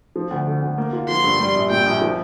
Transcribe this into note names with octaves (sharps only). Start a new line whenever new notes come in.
F3
D2
D3
D2
A#3
F4
F3 C6
G2
G3
A#1
A#2 G5
A#1
F3